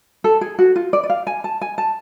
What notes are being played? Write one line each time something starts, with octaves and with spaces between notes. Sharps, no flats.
A4
G#4
F#4
F4
D5
D5
F5
G#5
A5
G#5
A5